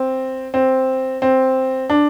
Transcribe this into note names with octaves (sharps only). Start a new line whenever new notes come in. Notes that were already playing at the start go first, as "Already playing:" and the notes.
Already playing: C4
C4
C4
D4